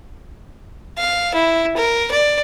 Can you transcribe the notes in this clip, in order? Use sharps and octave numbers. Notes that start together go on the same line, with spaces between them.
F5
E4
A#4
D5